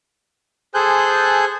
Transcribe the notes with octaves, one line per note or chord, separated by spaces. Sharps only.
G#4 A4 C5 G#5 F#6 G6